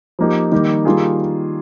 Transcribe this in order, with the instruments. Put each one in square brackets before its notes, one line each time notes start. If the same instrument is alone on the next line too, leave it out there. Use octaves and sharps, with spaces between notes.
[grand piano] F3 A#3 D#4 G4
D#3 G3 A#3 D#4 G4
D#3 G3 A#3 F4 G#4